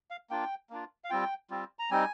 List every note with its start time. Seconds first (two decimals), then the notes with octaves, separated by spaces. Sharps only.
0.11 F5
0.30 A#3 D4 F4 G5
0.70 A#3 D4 F4
1.04 F5
1.10 G3 C4 F4 G5
1.50 G3 C4 F4
1.79 A#5
1.91 G3 C4 D#4 G#5